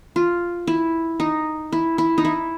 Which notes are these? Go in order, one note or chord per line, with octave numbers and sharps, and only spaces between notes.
F4
E4
D#4
E4
E4
D#4
E4